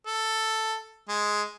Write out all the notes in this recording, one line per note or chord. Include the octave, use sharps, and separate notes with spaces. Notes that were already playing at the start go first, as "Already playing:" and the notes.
A4
G#3